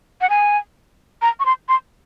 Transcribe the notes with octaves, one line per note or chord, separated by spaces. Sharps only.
F#5
G#5
A#5
C#6
C6
C6